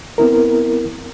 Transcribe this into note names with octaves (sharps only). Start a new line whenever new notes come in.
B3 C4 E4 A#4